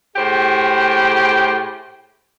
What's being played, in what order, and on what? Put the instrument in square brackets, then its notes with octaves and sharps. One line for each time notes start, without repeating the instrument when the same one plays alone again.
[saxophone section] A2 G4 G#4 C5